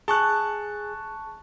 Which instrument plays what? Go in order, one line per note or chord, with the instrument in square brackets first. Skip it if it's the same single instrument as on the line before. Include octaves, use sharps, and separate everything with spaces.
[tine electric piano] G#4 [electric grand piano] A5 C#6 F#6